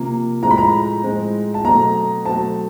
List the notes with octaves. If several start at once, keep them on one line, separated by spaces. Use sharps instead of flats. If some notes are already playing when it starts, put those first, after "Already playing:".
Already playing: C3 F3 A#3
A2 F3 G#3 C4 A#5
B5
A#5
A2 F3 G#3 C4
A5
B2 F#3 A3 C4 A#5
B2 F#3 A3 C4 A5